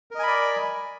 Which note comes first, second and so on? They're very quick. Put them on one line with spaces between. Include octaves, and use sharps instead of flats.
A#4 D#5 G#5 B5 D5